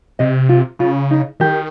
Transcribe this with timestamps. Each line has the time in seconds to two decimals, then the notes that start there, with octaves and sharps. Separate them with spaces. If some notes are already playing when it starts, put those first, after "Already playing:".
0.19 C3 D#5
0.49 F4
0.79 C#3 F4
1.11 D#4
1.40 D#3 G4